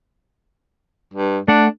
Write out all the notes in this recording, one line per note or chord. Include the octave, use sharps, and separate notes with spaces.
G2
A3 D4 F#5